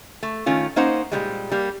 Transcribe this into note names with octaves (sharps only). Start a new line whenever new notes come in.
A3
D#3 A3 C#4 F4
A#3 C#4 D#4 C5 F#5
A#2 D#3 G3 G#3
G3 A#3